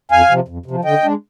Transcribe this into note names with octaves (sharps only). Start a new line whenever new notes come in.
F2 F5 G#5
C3 F3
F2
C3 F3
D3 D#5 G5
G#3 D4